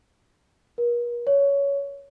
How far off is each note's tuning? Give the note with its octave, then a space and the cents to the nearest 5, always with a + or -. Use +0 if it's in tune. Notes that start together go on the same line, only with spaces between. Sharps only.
A#4 +45
C#5 +15